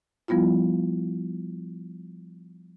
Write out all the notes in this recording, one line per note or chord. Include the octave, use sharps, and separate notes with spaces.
F3 G3 B3 E4 F4